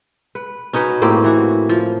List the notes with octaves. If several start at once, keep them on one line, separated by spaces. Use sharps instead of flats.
B4
C#4 D#4 F#4 B4
A2 A#3 C4 G4
E3 F#4
F3